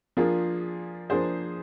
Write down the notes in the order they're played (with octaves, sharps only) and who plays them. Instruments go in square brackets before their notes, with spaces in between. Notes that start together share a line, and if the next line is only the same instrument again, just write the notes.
[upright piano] F3 A#3 D4 F4 G#4
F3 A#3 D4 G#4 C5